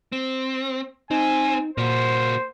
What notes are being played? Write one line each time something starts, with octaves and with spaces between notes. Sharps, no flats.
C4
C4 D#4 G#5
A#2 A#3 F#4 C5